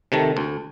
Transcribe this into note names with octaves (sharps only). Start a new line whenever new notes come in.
C3 D#3 A3
D2